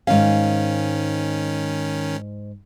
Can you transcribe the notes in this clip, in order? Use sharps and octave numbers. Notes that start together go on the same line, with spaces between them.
G#2 D#3 C#4 F5